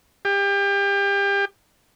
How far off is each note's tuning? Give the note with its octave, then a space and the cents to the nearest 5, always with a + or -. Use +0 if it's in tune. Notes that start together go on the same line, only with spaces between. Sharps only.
G4 +30